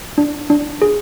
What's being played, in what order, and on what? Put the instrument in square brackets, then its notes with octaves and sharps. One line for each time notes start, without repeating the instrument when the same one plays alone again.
[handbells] D4
D4
G#4